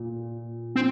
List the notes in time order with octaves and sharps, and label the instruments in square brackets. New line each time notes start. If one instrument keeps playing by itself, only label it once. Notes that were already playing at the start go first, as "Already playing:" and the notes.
Already playing: [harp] A#2
[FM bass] C4